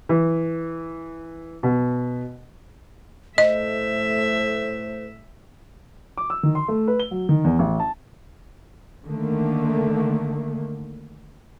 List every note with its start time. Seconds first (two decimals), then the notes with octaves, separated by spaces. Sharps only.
0.09 E3
1.63 B2
3.38 A2 A3 C5 D#5 E5
6.17 D6
6.30 E6
6.43 D#3
6.55 C6
6.68 A3
6.88 B4
7.00 G7
7.11 F#3
7.29 D#3
7.44 E2
7.59 A1
7.80 A5
9.05 D3 D#3 A3 A#3